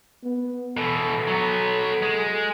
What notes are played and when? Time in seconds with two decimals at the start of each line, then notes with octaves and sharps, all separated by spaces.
0.24 B3
0.77 B2 E3 A4
1.28 F#3 B3
2.03 G#3